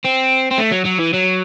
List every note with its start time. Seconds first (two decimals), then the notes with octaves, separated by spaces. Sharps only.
0.04 C4
0.51 C4
0.58 A3
0.72 F#3
0.86 F#3
0.99 E3
1.14 F#3